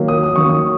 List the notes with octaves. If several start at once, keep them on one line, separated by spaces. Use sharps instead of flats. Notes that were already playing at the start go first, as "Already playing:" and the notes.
Already playing: D#3 F#3 A#3
D#6
D#6
D#3 F#3 A#3 C#6
D#6